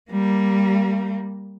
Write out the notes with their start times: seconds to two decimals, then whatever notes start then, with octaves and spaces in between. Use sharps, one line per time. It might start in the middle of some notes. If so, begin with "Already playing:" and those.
0.11 G3 A#3